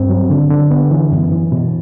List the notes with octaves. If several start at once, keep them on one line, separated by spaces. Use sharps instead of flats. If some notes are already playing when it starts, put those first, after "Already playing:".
Already playing: G2 C4
F#3
D3
D3
B3
E3
F#2
E3
B2